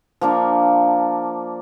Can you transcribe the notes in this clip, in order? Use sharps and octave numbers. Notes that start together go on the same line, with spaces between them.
F3 A#3 D4